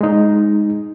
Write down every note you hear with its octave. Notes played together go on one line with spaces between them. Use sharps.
G#3 D#4